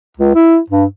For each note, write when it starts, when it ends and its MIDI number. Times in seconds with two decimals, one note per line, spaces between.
0.17 0.35 37
0.35 0.58 64
0.70 0.85 43